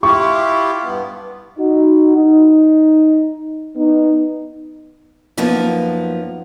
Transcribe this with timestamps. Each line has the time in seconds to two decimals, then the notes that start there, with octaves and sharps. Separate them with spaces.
0.03 E4 F4 G4 C#6
0.83 G2 B3
1.58 D#4 F#4
2.17 D#4
3.75 B3 D#4
5.37 F#2 F3 A#3 B3 D#4